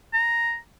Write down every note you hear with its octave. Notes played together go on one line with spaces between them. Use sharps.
A#5